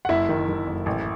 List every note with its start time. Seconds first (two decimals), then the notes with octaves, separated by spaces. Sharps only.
0.05 F#5
0.09 F#1 E4 E5
0.29 D#3
0.49 D#3
0.67 F#1
0.86 A1